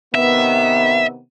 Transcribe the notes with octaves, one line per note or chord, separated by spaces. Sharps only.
C3 D#3 B3 E5